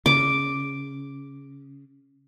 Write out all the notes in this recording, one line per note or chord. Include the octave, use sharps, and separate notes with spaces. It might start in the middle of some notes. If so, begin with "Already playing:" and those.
C#3 D6